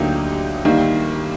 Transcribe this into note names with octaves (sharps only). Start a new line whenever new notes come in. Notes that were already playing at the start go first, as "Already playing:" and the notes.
Already playing: D2 D3 F#3 A#3 D#4 G4
D#3 G3 A#3